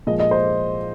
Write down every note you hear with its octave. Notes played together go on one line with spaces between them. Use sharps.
A#2 F3 G#3 D#5
D#5
C5